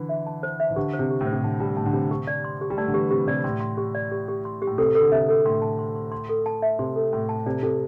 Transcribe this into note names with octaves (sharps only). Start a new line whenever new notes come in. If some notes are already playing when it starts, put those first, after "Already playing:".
Already playing: D3 E3
E5
A5
C5
E5
E3
D3 G4
C5
C3
G4
A2
C5
C3
D3 A5
G3 A5
A2 A5
D3
C3 A5
G4
D5
C6
G4
G3
A3 D5
D3
E3 G4
C3 G4
C3 D5
A2 C6
C6
G4
D5
G4
G4
C6
G4
A2
C3 A4
A4
D3
C3 E5
A4
A2 C6
A5
C6
C6
C6
A4
A5
E5
C3 C6
A4
A2 C6
A5
C3 D5
C3 A4